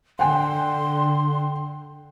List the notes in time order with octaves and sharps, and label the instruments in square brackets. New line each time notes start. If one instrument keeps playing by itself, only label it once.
[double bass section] D3 [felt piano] F#5 G5 [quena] C6